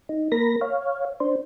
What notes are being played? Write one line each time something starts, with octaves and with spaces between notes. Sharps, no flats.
D#4
A#3 A#4 B5 A#6
C#5 F5
D4 C5